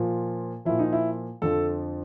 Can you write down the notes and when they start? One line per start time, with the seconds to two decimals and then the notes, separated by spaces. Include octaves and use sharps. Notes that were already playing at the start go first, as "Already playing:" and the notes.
Already playing: A#2 F3
0.65 A#2 F3 E4
0.79 D#4
0.93 E4
1.42 F2 D3 F3 A4